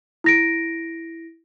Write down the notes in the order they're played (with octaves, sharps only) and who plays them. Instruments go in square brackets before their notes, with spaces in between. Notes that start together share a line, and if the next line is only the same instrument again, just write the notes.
[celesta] E4 A#6 D7